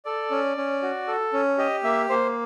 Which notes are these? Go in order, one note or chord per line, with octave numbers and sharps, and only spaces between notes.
A4 D5
C#4
C#4
F#4
A4
C#4
G4 D#5
A#3 E5
A#3 C5